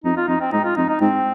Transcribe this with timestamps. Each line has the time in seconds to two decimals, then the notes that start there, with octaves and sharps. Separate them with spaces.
0.04 F2 D#4
0.17 F4
0.28 F2 D#4
0.41 C4
0.52 G#2 D#4
0.65 F4
0.76 F2 D#4
0.89 D#4
1.01 G#2 C4